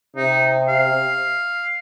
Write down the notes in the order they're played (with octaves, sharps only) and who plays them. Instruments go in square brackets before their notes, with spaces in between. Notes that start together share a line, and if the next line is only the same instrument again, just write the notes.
[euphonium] C3 [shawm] D#4
[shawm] F5